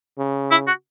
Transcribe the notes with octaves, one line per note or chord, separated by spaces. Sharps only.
C#3
E4
F#4